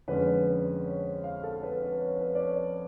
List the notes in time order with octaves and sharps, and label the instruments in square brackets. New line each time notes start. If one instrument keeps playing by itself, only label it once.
[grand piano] F2 D3 G#3 C#4 B4
B4
C#5
F5
A4
B4
B4
C#5
B4
D5
C#5